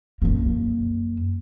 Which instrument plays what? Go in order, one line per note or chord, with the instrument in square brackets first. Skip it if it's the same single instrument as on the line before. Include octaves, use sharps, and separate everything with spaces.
[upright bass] F#2 A#3